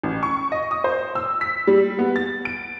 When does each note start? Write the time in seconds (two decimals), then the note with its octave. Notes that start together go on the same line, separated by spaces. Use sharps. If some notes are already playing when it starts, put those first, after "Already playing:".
0.03 A1
0.23 C#6
0.52 D#5
0.71 D#6
0.84 C5
1.15 E6
1.41 B6
1.67 G3
1.99 B3
2.16 A6
2.45 D7